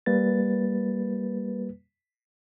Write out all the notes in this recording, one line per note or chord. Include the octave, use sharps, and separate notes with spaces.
G3 A#3 B4 A6